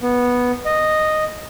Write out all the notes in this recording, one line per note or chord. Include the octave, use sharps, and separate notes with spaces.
B3
D#5